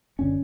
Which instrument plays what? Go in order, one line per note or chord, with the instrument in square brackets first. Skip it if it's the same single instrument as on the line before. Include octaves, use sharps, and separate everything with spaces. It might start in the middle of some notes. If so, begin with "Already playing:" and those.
[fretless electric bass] F#1 D3 C#4